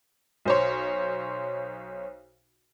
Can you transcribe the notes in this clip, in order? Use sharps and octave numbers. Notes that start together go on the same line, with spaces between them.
B1 C5 C#5